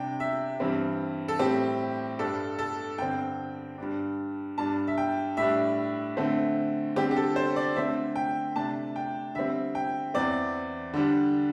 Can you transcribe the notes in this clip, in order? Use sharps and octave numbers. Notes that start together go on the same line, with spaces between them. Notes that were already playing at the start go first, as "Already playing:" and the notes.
Already playing: C3 G3 D4 G5
E5
G2 E3 G3 C4
A4
A2 G3 C4 G4
G2 G3 D4 A4
A4
G2 D3 C4 G5
G2 G3 D4
G2 G3 D4 A5
E5
G5
A2 G3 D4 E5
D3 A3 C4
D3 G3 C4 G4
G4
A4
C5
D5
D3 A3 C4 E5
G5
C3 A3 D4 A5
G5
D3 G3 C4 E5
G5
E2 E3 C4 D5
D3 G3 D4